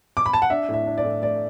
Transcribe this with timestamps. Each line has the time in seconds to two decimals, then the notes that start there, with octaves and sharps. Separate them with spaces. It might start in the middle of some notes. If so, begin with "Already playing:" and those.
0.17 D6
0.26 B5
0.33 A5
0.42 F#5
0.50 D4 E5
0.69 A2
0.74 E5
0.86 D4
0.98 D5
1.04 A2
1.22 A3 D5